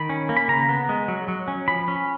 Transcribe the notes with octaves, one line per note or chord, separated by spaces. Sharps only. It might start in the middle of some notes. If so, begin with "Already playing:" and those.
Already playing: D#3 B5
C#4
A#3
B5
C#3 A#5
B3
G#3
F#3
F#3
C#4
F3 B5
C#4